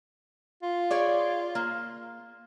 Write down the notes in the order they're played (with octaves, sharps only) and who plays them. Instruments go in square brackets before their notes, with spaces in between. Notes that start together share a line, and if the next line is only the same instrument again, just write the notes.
[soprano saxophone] F4
[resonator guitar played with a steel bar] G#4 C#5 D5
A#3